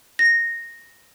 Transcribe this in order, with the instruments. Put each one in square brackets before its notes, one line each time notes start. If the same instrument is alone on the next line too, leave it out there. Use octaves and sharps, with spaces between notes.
[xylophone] A#6